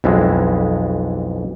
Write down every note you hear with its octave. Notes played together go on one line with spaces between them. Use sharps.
B1 F2 E3 G#3